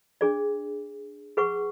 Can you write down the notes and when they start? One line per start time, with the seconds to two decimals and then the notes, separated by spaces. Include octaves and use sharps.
0.21 D4 G#4 D5
1.37 G#4 B4 F#5 C#6